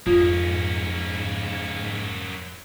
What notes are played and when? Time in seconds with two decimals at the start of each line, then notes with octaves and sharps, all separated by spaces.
0.06 F2 G#2 A#3 C#4 F4